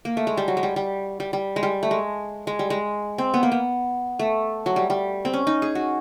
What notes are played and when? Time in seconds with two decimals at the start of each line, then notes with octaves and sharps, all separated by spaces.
0.05 A#3
0.17 A3
0.27 G#3
0.37 G3
0.48 F#3
0.57 G#3
0.63 G3
0.76 G3
1.20 G3
1.33 G3
1.56 G#3
1.63 G3
1.83 A3
1.91 G#3
2.47 G#3
2.59 G3
2.70 G#3
3.18 C4
3.34 B3
3.43 A#3
3.52 B3
4.19 A3
4.66 F#3
4.76 G3
4.90 G3
5.25 C4
5.33 C#4
5.47 D#4
5.62 G#4
5.75 F#4